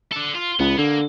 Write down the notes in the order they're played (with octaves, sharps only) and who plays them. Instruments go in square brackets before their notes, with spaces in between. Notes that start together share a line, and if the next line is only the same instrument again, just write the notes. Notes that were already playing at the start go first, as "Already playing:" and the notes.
[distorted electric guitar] D3 A4
F4
[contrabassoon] C#2 [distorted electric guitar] B3
[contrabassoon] D3 [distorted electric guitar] A#3